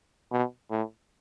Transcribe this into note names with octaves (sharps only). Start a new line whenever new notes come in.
B2
A2